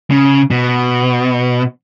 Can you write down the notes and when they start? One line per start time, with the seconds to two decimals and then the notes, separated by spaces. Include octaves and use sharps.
0.10 C#3
0.51 B2